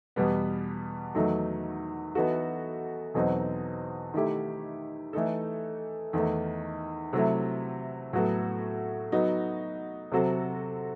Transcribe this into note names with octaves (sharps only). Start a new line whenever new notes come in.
E2 B2 G3 B3
E2 D#3 F#3 A3 D#4
E3 B3 D#4 F#4 A4
E2 B2 F#3 C4 D#4
D#3 A3 E4 G4
E3 A3 D#4 A4
E2 D#3 A3 D#4
C3 F#3 A3 E4
A2 F#3 B3 F#4 A4
F#3 B3 D#4 F#4
C3 F#3 C4 F#4 A4